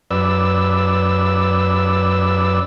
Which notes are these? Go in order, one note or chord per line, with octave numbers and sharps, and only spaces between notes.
F#2 B4 D5 E6